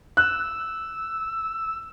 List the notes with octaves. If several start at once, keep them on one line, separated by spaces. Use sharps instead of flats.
E6 F#6